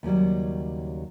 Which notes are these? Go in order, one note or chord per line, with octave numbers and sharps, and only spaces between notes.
D#2 C#3 F#3 G3